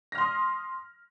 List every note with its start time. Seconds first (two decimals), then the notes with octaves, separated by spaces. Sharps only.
0.12 A#6
0.15 F6
0.18 C6
0.21 D#6